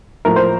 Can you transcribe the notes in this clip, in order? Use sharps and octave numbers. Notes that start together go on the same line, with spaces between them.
A2 F3 A#3 A#4
C5